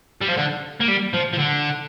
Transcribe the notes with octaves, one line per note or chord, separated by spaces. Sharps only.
G3
F3
D3
A#3
G3
F3
F3
D3